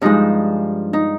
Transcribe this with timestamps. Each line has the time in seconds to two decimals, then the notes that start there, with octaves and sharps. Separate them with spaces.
0.01 G2 F3 G#3 D#4
0.93 D#4